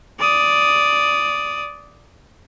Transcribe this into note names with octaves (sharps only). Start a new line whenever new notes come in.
D5 D#6